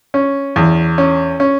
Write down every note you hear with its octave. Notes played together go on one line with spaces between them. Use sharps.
C#4
E2
C#4
C#4